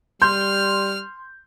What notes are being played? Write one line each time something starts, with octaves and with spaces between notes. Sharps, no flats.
G3 C6 F6 G6